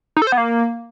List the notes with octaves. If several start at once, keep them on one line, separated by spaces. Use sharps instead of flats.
D#4
A4
C5
B3
A#3